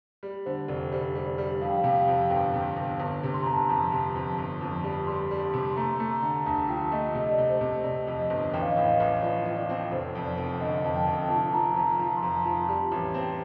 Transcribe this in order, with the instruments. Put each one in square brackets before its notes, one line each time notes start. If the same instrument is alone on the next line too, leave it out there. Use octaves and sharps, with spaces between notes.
[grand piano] G3 [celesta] D5
[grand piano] D3 [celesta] C5
[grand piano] F1 [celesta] D5
[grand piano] G3 [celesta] C5
[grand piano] G3
[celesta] D5
[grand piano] G3
[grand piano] F2 [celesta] F5
[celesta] G5
F5
[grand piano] C3 [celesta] G5
[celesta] F5
G5
[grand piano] F2 [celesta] F5
[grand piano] G1 [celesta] G5
[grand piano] C3
G1
G1
C3
[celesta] C6
[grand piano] G1 [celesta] A#5
[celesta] A5
A#5
[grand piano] F2
C3
F2
G1
F2
G3
[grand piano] G3 [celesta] C6
[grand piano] G3
C3
[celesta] C6
[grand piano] A3 [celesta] A#5
[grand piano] A3
[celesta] A#5
[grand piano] D3
[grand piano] D2 [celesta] A5
[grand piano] F3 [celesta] G5
[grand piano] A3 [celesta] D#5
[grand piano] C3 [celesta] D#5
[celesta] D#5
D5
[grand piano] C3
[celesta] C5
[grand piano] C3
[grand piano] C3 [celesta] D5
[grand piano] F2
[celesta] D#5
[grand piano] G1
[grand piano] A1 [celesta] G5
[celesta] F5
D#5
[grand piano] A2 [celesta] F5
[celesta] D#5
[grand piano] A1
[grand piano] F3 [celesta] D5
[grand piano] F3
[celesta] D5
[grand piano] C4
[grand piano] F1 [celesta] C5
[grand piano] F2
[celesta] D5
[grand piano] F1
[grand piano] D3 [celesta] D#5
[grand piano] F2 [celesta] A5
[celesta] G5
[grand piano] F1
[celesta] G5
[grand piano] F3 [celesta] A5
[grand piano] F3 [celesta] A#5
[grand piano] F2 [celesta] A#5
[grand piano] F3
[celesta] C6
[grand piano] F2 [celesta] A#5
[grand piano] F3 [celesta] A5
[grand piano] G3
A1
C4